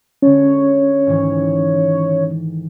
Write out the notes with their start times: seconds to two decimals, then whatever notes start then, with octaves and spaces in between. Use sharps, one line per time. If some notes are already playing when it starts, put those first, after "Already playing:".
0.22 D3 G#3 C#4 A4 C#5
1.06 G#2 D#3 E3